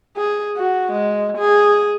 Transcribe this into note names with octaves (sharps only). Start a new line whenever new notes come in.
G#4
F#4
G#3
G#4